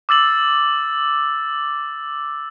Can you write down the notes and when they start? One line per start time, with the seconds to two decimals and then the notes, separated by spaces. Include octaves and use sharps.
0.09 D6 E6 A6 F#7